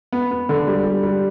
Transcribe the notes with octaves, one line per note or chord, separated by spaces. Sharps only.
B3
B3
D3
G3
G3
G3